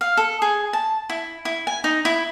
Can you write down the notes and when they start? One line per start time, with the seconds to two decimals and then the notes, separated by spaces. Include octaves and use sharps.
0.01 F5
0.17 A4
0.42 G#4
0.73 A5
1.10 E4
1.45 E4
1.67 G#5
1.84 D#4
2.05 E4